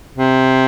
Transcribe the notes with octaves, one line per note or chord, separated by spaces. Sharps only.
C3